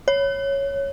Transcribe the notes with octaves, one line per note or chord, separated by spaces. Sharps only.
C#5